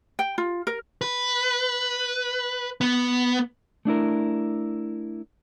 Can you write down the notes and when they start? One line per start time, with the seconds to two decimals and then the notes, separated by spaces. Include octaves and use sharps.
0.19 G5
0.38 F4
0.67 A#4
1.01 B4
2.81 B3
3.85 A3 D4 E4 A#4